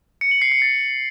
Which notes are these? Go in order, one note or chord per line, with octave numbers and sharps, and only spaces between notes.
C#7
F#7
C7
C#7
A6